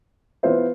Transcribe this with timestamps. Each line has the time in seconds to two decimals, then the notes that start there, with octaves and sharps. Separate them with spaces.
0.43 E3 B3 F4 C5 E5